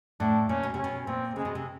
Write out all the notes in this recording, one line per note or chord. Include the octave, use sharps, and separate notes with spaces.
A2 D4
A#2 C#4
B2
C3 C#4
B2
A#2 C4
C#3 G#3
B2
C3